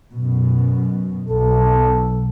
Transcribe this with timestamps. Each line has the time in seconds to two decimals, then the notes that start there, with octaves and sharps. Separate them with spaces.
0.13 F#2 B2
1.29 B1 A4